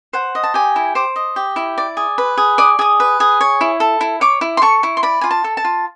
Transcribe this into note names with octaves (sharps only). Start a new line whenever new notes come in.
C5 F#5
D#5
A5
G4 G#5
E4
C5 D6
D#5
G4
E4
D5
G#4
B4
G#4
D5 D#6
G#4 D#6
B4
G#4
C#5
E4
A4
E4
C#5 D6
E4
C6
A4 C#6
E4
C6
D5 B5
F4 G#5
A5
A4
A5
F4